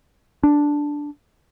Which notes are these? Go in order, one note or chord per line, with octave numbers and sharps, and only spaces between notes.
D4